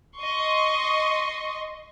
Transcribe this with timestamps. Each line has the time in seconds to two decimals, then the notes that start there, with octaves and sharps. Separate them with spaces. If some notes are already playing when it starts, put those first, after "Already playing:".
0.19 D#5 C6 C#6